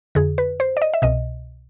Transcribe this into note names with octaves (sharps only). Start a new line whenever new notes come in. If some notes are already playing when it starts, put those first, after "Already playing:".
F2 D3 G#4
B4
C5
D5
D#5
E5
C2 B2 D#5